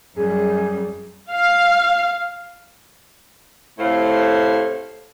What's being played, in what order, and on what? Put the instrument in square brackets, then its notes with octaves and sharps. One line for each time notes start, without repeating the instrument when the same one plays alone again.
[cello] F#2 G3 [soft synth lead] G#4
[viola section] F5
[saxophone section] A2 C3 A3 C5 F5